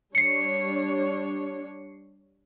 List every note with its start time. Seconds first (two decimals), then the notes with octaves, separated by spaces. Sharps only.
0.15 G3 D4 C#5 C7 C#7